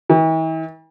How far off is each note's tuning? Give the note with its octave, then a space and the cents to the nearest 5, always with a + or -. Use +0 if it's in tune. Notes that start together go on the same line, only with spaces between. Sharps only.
E3 -40